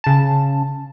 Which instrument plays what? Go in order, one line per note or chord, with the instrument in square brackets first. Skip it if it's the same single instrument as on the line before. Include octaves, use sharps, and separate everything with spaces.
[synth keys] C#3 A5